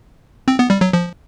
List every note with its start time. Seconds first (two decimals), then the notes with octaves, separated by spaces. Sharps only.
0.48 C4
0.59 B3
0.70 G3
0.81 F#3
0.93 F3